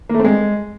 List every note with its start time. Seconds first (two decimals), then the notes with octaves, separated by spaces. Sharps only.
0.10 A#3
0.15 A3
0.20 C4
0.25 G#3